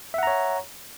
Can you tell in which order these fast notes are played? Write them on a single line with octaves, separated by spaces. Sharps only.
E5 F#5 A#5 C#5